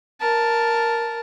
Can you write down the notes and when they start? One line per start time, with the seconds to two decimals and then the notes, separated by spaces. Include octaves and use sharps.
0.20 A#4 A5